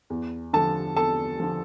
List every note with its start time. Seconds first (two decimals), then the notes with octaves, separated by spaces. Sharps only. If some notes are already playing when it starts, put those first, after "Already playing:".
0.10 E2
0.53 D3 F3 A4 A5
0.96 E2 A4 A5
1.40 D3 F3